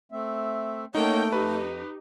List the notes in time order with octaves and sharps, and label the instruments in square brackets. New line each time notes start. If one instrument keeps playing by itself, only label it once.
[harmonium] A3 C4 E5
[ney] A3 [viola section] A#3 C#4 G5 [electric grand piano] D#4 [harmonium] C#5 F#5
[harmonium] F2 [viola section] D#4 G4 [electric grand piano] B4